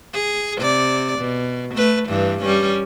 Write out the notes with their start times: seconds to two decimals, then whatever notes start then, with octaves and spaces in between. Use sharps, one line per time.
0.13 G#4
0.57 C3 D5
1.19 B2
1.74 A3 B4
2.08 G2 E3
2.42 G3 C#4